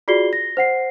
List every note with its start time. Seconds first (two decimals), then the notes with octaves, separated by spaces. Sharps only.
0.08 F4 F#4 G#4 D5 C7 G7
0.33 A#6
0.57 C5 F#5 C7